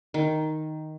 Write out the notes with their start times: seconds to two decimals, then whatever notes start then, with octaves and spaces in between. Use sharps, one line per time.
0.14 D#3